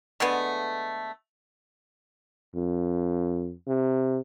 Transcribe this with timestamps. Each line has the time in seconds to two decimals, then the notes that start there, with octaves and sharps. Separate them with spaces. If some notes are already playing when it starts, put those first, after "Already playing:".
0.20 D3 G#3 A3 B3
2.55 F2
3.67 C3